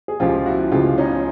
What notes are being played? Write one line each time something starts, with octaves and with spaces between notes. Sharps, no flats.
G#4
C#2 C#3 F3 F4 G4
E4 F#4
C#2 C#3 F3 F4 G4
C#4 D#4